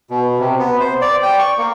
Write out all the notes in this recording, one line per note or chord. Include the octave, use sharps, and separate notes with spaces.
B2
C3
B3
C5
D5
G5
C#6
A#3